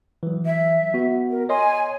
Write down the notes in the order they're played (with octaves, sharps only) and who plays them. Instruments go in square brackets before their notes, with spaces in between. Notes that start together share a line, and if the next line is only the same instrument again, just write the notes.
[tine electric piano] E3 F#3
[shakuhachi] E5
[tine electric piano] B3 F#4
[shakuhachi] A#4
[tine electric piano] C#5 D#5 C6 [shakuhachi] G#5